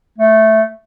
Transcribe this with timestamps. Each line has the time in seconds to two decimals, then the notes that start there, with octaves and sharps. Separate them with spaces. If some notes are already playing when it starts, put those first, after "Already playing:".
0.18 A3